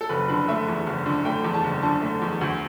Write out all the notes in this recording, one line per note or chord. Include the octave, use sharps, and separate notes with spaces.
A4
F#1 B4
D3 B4
A3 E5
E2
F#1
D3
A3 G5
E2
A5
F#1
D3 A5
A3
E2
D2